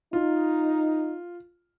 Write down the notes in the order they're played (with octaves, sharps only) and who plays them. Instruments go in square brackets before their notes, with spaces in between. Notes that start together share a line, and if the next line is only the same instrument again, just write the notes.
[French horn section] D#4 [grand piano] F4